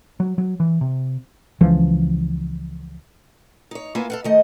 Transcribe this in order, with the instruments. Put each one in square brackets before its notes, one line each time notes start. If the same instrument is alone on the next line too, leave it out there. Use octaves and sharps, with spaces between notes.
[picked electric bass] F#3
F#3
E3
C3
[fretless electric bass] C#2 E3 F3
[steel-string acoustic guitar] D#4 C#5
A#3 B3 E4 F4 G#5
A4 F5 F#5
D#3 A3 D#5